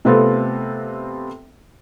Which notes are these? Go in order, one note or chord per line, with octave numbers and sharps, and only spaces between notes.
C3 A3 B3 C4 F4 A4